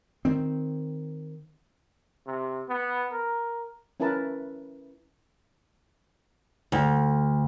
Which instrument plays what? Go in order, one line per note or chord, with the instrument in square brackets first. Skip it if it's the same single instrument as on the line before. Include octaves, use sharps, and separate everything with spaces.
[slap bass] D#3 C4
[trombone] C3
B3
A#4
[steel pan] C#4 E4 A#4 B4 A5
[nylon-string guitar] D2